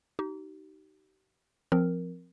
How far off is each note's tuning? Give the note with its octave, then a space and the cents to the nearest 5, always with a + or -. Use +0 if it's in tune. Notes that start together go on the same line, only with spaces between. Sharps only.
D#4 +0 G4 -40
F3 +0 C4 +0 A#4 +0